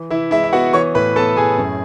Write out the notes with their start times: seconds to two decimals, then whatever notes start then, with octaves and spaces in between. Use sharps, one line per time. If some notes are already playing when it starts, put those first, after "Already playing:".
Already playing: E3
0.10 E3 E4 E5
0.31 G#3 E4 E5
0.44 E5
0.53 B3 F#4 F#5
0.73 E3 C#5 C#6
0.95 A2 B4 B5
1.16 B3 A4 A5
1.36 A2 G#4 G#5
1.58 F#2